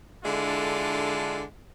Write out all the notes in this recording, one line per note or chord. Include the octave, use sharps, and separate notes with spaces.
D3 G#3 D4 E4 F4 A4